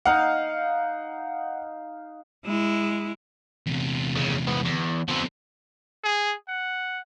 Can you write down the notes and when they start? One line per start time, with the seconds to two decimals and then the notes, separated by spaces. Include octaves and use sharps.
0.05 D#4 F5 F#5
2.45 G#3 E4
3.67 E2 C3
4.16 D#2 C#3
4.47 G#2 B3
4.65 E2
5.08 D3 F3 B3 C4
6.04 G#4
6.49 F#5